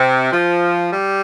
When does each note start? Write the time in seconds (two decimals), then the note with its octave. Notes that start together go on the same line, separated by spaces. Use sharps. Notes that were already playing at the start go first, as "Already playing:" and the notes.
Already playing: C3
0.33 F3
0.91 G3